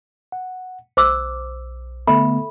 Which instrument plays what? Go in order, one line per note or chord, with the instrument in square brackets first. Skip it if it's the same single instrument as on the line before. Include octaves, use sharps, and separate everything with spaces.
[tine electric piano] F#5
[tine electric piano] B1 [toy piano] C5 D6 E6
[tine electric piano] D3 A3 B3 [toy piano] A4 E5 B5